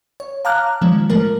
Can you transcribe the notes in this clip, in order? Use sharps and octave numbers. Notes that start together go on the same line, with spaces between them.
C#5
F5 A5 A#5 D6 F6 F#6
D#3 F3 G#3
A2 F3 A3 A#4